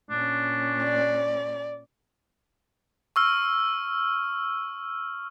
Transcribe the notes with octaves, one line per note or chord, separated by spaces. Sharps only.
A#2 C#4 D4
D5
C#6 E6 F6